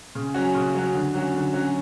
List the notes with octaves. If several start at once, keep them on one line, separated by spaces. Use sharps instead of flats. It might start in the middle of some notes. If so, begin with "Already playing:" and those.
C#3
F#3 C#4 F#4
C#3
F#3 C#4 F#4
D3
F#3 C#4 F#4
D3
F#3 C#4 F#4